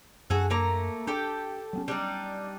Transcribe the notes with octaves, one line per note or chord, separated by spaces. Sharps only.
F#2 C#4 D4 F#4 G#4 A4
A3 A#3 A#5
D4 G4 A4 G5
F#3 B3 C#4
G3 D4 D#4